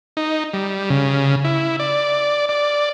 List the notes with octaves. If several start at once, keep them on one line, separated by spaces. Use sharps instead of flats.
D#4
G3
C#3
E4
D5
D5